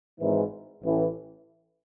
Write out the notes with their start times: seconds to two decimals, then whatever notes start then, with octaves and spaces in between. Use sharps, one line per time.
0.20 G#1 G#2 E3
0.83 A1 A2 E3